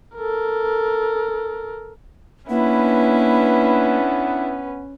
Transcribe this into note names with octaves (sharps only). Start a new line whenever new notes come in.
A4 A#4
A#3 B3 C#4 D4 E4 B4